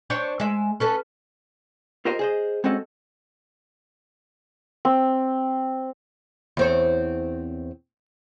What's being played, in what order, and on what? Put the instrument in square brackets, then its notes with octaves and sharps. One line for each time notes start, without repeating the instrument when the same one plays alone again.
[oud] D4 C5 C#5
G#3 E5
C#4 A4 B4
[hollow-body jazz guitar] F4 G4 A#4 C5 D#5 F5
G#4 C5 D#5
G#3 C4 C#4 F#4 A4 D#5
[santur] C4
[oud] E2 C4 C#5